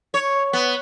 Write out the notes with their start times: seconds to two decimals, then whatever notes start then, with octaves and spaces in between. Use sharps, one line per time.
0.14 C#5
0.53 B3